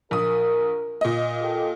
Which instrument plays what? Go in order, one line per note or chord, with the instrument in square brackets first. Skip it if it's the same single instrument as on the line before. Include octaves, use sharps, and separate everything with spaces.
[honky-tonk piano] A#1 D#6 [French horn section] A#4
[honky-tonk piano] A#2 D#5
[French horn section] G4 A4